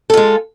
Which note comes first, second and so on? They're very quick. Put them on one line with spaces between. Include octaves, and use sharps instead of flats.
A4 F4 G#3